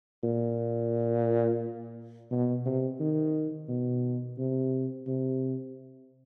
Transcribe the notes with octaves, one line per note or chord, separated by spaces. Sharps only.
A#2
B2
C3
D#3
B2
C3
C3